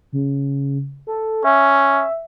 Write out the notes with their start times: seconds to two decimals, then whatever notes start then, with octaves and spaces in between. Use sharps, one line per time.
0.13 C#3
1.07 A4
1.44 C#4 E5